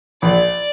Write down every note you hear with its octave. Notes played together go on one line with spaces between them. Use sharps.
A#1 D5